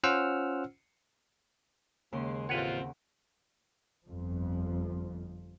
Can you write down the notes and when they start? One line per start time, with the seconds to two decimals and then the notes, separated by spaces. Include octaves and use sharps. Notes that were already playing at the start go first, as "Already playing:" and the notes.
0.04 C#4 F4 C5 F#5 E6 F6
2.12 D#2 C#3 G#3 C6
2.49 A1 A#3 C4 F4 B4 C#5 F#5
4.06 G1 F2 F3